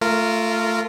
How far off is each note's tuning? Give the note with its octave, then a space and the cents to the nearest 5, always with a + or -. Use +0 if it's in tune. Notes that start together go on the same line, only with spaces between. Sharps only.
A3 +15 F4 -10 A#4 -10